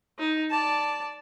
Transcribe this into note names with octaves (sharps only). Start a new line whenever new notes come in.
D#4
D5 A5